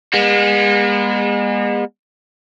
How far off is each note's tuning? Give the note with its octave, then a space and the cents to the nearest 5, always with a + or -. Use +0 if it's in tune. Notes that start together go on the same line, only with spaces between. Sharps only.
G#3 -35 B3 -40